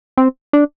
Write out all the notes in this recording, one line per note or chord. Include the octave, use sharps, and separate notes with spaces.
C4
D4